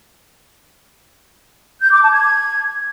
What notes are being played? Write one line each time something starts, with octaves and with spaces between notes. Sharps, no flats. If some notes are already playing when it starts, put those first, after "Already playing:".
G6
D6
A5
G#6